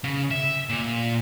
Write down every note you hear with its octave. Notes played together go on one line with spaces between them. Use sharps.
C#3
E5
A#2